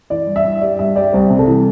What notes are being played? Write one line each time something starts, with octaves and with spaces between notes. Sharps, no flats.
E3 D5
G2
E5
G2
G4 D5
G2 E5
G4 D5
C2 C5
C3
A4
E3